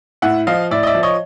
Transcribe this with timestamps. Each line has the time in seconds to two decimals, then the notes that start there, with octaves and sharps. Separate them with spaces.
0.22 A2 E5 F#5
0.47 F3 D#5 F5
0.71 A2 D5 E5
0.83 D#5
0.87 D5 E5
0.95 F3
1.03 C#5 D#5